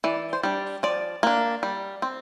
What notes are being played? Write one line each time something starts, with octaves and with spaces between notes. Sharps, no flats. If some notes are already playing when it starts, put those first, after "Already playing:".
E3 D5
C5
G3 D4 D5
F3 D5
A#3 D4
G3
C4